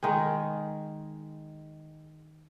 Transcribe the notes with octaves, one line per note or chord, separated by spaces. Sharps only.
D#3 G#3 G#4